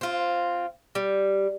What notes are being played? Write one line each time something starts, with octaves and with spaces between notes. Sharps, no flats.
C4 F4
G3